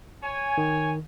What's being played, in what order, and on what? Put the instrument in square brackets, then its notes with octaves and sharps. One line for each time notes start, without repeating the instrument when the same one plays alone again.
[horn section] C#5 G#5
[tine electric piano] D#3